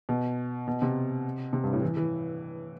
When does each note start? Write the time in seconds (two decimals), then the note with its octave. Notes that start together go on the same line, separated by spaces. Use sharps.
0.09 B2
0.68 B2
0.82 C3
1.53 C3
1.64 G2
1.73 A2
1.82 E3
1.97 E3